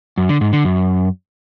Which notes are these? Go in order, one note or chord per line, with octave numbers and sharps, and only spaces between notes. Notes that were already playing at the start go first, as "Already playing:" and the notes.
F#2
D3
G#2
D3
F#2